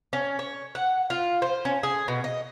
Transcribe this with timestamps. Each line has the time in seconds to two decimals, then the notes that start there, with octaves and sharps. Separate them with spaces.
0.13 C#4
0.39 C#5
0.75 F#5
1.10 F4
1.42 C5
1.65 C#4
1.83 G#4
2.08 B2
2.24 D#5